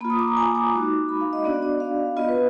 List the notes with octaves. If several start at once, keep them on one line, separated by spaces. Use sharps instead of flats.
A#3 F4 B5
D#6
D6
A#5
G#5
D6
G#3 D#4 F#4
B5
F5
D#5
B3 D4 F#4 D5
D5
F5
B3 F4 D#5
B4